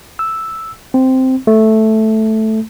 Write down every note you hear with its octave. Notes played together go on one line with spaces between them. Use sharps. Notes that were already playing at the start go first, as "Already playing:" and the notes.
E6
C4
A3